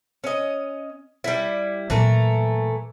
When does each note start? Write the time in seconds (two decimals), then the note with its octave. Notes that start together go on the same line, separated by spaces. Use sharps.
0.24 C#4 D#5
1.24 G3 E4
1.90 A#2 E3 F#3 A3 A#4